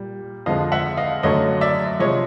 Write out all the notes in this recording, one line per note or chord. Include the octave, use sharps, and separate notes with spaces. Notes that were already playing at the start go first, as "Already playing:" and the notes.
Already playing: A#2 G3
F2 D3 F3 G#3 D#5 F5
E5 F#5
D#5 F5
F#2 D3 F#3 A3 C#5 D#5
D5 E5
C3 F3 G#3 C#5 D#5